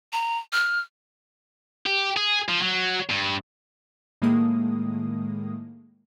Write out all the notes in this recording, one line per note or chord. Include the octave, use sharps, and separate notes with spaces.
A#5
F6
G4
G#4
F3
F#3
G2
A2 D#3 G#3 A#3 D#6